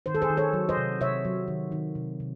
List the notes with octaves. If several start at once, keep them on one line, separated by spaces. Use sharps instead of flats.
D#3 C5
A4
G#4 C5
D#3
A4 C#5
F#3
C5 D#5
C3
C3 C#5 E5
F#3
D#3
D#3
C3
C3